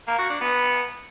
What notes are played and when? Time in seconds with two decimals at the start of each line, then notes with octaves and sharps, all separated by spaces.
0.07 A#3
0.19 F#4
0.30 D4
0.41 B3